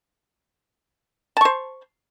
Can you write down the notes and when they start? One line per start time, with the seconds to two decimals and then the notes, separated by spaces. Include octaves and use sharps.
1.37 A5
1.41 C#6
1.45 C5